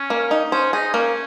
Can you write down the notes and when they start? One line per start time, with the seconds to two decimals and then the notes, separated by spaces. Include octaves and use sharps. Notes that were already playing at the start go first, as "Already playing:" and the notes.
Already playing: C#4
0.10 A#3
0.31 D#4
0.52 C#4 C5
0.73 D#4 G#4
0.94 A#3 C#4